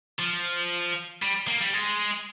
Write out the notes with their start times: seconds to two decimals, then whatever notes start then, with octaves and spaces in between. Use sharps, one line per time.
0.19 F3
1.22 G3
1.48 A#3
1.61 G3
1.73 G#3